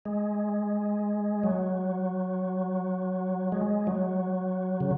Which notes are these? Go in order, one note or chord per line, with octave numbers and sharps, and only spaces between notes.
G#3
F#3
G#3
F#3
C#3